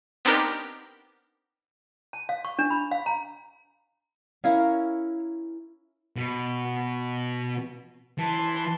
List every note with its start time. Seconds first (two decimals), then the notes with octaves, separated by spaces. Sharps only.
0.25 B3 C4 D4 D#4 G4 A#4
2.13 A5
2.29 F5
2.45 C#6
2.59 D4
2.70 B5
2.91 F5
3.06 A#5
4.44 C#4 E4 A#4 F5
6.16 B2
8.18 E3 A5 C6